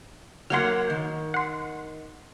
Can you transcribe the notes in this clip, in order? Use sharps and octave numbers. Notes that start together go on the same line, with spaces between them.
F#3 A#3 F#5 C6 F6
D#3
F#5 C6